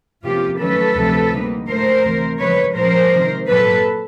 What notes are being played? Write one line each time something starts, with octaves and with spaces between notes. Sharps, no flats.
C3 F3 A#3 C#4 F4 G4
D#3 F#3 A3 C#4 A4 B4
D2 C3 F3
D3 G3 A#3 D#4
A2 F3 A3 A#4 C5
D2 C3 E3
C#3 F3 G#3 B4 C#5
A#2 F3 G#3 C#4 A#4 C5
C3 D#3 G#3
A#2 F#3 A#3 A4 B4